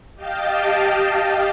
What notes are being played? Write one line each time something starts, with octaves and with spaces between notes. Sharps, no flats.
G4 D#5 F5 G5 A5